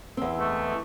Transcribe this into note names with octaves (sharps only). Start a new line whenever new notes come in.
E2 C4
E3 G#3 A3